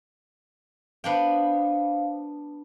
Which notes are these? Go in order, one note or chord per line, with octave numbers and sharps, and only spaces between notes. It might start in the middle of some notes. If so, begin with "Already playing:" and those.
B3 D4 C5 F5 G5